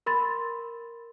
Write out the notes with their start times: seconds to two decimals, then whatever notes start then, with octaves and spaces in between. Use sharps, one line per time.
0.06 A#4 B5 C6 A6